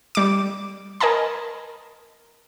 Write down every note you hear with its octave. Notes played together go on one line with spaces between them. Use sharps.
G3 D6
A#4 D#5 G#5 A5 B5